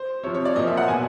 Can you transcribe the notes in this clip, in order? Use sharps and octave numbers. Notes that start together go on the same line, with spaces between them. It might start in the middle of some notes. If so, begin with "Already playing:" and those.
Already playing: C5
C3 F3 C#5
C#5
D5
A#2 F3 D#5
E5
F#5
B2 G#5